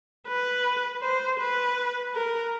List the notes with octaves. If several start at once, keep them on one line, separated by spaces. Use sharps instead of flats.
B4
C5
B4
A#4